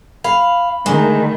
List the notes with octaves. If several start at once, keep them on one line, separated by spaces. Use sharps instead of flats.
F5 B5
D3 D#3 G#3 A3